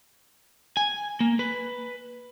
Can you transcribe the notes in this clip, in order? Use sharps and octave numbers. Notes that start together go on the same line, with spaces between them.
G#5
A#3
B4